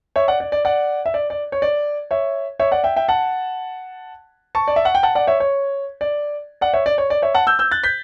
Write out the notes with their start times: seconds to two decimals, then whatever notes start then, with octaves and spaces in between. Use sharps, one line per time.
0.16 C#5 E5
0.28 D5 F#5
0.40 D5
0.52 D5
0.65 D5 F#5
1.06 E5
1.14 D5
1.30 D5
1.52 C#5
1.62 D5
2.11 C#5 E5
2.59 C#5 E5
2.72 D5 F#5
2.84 E5 G5
2.96 E5 G5
3.09 F#5 A5
4.55 A5 C#6
4.68 D5
4.76 E5
4.85 F#5
4.95 G5
5.03 F#5 A5
5.15 D5 F#5
5.27 C#5 E5
5.40 C#5
6.01 D5
6.61 D5 F#5
6.73 C#5 E5
6.86 D5
6.98 C#5
7.10 D5
7.22 C#5 E5
7.34 F#5 A5
7.47 E6 G6
7.59 E6 G6
7.72 F#6 A6
7.84 G6 B6